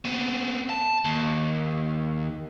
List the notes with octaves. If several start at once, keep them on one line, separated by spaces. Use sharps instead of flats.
B3 C4
A5
D#2